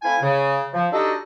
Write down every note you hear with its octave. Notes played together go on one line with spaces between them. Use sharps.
A3 C4 E4 F5 G#5
C#3
F3
D4 D#4 F#4 G4 A4 D#5